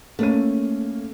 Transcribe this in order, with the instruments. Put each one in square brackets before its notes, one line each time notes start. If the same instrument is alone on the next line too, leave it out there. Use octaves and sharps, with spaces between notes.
[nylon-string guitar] A3 [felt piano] A#3 C#4 D#7